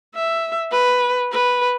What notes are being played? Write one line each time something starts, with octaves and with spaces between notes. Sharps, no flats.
E5
B4
B4